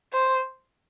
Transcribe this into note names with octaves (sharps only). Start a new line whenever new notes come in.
C5